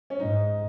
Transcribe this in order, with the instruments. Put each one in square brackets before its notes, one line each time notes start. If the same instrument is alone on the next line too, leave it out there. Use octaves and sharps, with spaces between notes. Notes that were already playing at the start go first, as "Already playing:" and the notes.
[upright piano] C#4
[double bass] G#2 [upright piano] D#4